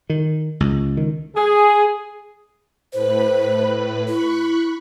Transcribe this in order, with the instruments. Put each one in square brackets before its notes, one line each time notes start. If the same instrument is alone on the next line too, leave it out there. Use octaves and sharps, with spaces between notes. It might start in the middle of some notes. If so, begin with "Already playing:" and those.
[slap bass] D#3
C#2
D#3
[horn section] G#4
[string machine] A2 B4 B5 [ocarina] C5
[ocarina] E4 [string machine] B5 C#6 F#6